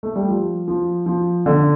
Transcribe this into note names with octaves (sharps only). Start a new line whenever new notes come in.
A3
G3
F3
F3
F3
D3